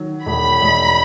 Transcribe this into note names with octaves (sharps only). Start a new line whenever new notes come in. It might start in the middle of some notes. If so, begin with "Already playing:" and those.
Already playing: D#3 F#3
E1 B5
E1